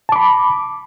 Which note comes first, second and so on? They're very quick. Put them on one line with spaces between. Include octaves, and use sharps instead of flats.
A5 D6 B5